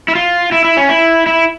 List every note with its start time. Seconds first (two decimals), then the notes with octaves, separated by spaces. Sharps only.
0.08 E4
0.15 F4
0.52 E4
0.64 E4
0.77 C#4
0.89 E4
1.26 E4